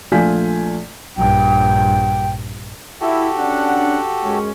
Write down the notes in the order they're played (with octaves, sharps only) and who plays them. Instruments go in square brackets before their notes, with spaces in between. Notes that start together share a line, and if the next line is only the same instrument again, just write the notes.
[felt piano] A#1 A3 F4 G#5 G6 B6
[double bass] A#1 G2 [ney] G5
[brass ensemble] E4 [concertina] F#4 G4 A4
[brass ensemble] C#4 D4 F#5
F#2 G#3 C#4